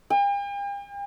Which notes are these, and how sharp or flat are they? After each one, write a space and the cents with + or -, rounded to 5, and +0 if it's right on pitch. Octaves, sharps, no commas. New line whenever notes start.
G5 +45